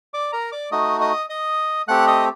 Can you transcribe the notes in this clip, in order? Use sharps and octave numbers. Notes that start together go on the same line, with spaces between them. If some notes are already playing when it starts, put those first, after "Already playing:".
D5 D6
A#4 A#5
D5 D6
A3 D#4 F#4 D#5 D#6
D#5 D#6
D#5 D#6
A3 C4 G4 F#5 F#6
D#5 D#6